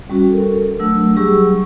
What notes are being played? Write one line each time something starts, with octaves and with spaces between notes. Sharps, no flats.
G3 C#4 F#4
A4 A#4
F#3 A3 D4 E6
F#3 G3 G4 G#4 C#6 E6